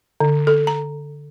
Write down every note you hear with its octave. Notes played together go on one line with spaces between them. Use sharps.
D3
A4
A#5